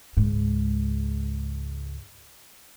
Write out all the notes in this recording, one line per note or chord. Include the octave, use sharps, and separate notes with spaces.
C#2 G#2